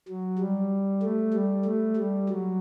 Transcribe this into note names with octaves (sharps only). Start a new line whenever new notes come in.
F#3
G3
A3
G3
A3
G3
F#3